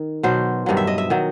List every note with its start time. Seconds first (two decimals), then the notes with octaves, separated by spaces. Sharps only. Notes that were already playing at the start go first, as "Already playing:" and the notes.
Already playing: D#3
0.23 B2 F#3 C5
0.66 G2 D#3 F#3
0.77 E5
0.87 D#5
0.98 E5
1.10 D#3 F#3